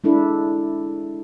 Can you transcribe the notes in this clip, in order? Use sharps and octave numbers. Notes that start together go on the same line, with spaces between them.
G#3 D4 E4 A4